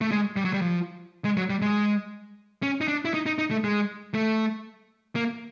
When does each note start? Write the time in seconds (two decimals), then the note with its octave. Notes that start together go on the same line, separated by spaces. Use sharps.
0.01 A3
0.11 G#3
0.36 G3
0.45 F#3
0.53 G3
0.62 F3
1.25 G#3
1.37 F#3
1.50 G3
1.62 G#3
2.62 C#4
2.81 D#4
2.88 D4
3.05 E4
3.14 D#4
3.26 D#4
3.38 D#4
3.51 A3
3.64 G#3
4.14 A3
5.15 A#3